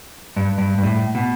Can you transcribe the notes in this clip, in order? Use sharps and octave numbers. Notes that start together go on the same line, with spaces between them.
G2
G2
G2
A2
B2